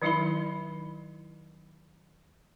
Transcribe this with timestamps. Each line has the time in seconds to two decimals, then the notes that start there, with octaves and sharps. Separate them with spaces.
0.02 D#3 F#3 D#4 E4 E5 B5